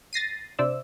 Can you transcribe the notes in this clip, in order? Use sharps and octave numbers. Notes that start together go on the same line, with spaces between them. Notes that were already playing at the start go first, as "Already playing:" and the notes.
A6 A#6 C7 D#7
C3 D4 C5 D5 E5 E6